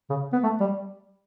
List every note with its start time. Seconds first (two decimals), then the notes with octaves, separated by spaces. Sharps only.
0.10 C#3
0.33 B3
0.43 A3
0.60 G3